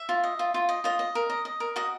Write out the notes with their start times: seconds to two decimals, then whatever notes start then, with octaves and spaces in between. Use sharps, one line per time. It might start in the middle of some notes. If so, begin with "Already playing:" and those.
Already playing: E5
0.09 F4
0.24 D#5
0.39 F4
0.54 F4
0.69 D#5
0.84 F4 D#5
0.99 D#5
1.15 A#4
1.30 D#5
1.45 D#5
1.60 A#4
1.76 F#4 D#5